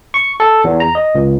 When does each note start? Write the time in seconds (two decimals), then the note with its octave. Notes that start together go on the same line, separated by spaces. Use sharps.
0.14 C#6
0.40 A4
0.64 E2
0.80 A#5
0.95 D#5
1.15 C#2